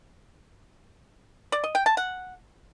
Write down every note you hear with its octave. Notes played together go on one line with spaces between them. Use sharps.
D5
D#5
G5
A5
F#5